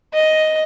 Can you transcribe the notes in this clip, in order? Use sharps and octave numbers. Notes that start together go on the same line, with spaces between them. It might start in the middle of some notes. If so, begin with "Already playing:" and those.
D#5